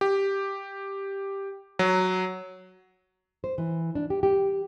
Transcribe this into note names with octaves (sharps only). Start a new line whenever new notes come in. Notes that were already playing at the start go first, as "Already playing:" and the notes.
G4
F#3
C5
E3
D4
G4
G4